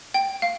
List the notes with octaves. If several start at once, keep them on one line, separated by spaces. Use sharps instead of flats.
G5
F5